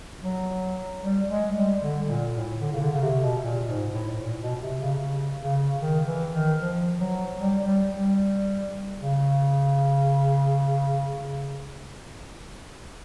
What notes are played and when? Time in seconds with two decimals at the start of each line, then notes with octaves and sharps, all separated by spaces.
0.22 F#3
1.02 G3
1.28 G#3
1.56 G3
1.82 D3
2.08 A#2
2.35 A2
2.61 D3
2.72 C#3
2.82 D3
2.93 C#3
3.02 C3
3.22 B2
3.41 A#2
3.67 G#2
3.94 A2
4.09 A2
4.21 A#2
4.41 B2
4.61 C3
4.80 C#3
5.01 C#3
5.40 C#3
5.80 D#3
6.06 E3
6.33 D#3
6.60 F3
7.00 F#3
7.39 G3
7.66 G3
7.92 G3
8.99 C#3